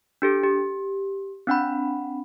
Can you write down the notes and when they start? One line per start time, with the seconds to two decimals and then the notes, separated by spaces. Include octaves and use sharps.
0.22 D4 G4 A4
0.44 G4
1.47 C4 D4 F#5 B5